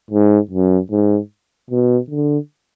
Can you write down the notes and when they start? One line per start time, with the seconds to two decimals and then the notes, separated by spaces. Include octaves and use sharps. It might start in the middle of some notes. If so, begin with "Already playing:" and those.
0.11 G#2
0.51 F#2
0.91 G#2
1.71 B2
2.10 D3